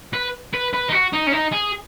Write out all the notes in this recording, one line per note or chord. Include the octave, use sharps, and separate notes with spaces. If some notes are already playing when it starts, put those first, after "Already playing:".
B4
B4
B4
D#4
F#4
D#4
C#4
D#4
G#4